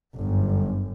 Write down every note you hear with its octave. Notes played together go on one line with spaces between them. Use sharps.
G1 F#2